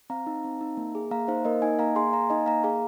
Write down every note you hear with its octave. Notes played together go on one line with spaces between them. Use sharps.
C4 F5 A#5
D#4
C4
D#4
A#3
G#4
A#3 F5 A#5
D#4 C5 F5
A#3 A#4 D#5
D#4 D#5 G#5
A#3 F5 A#5
G#4 G#5 C6
A#3 F5 A#5
D#4 D#5 G#5
A#3 F5 A#5
G#4 F5 A#5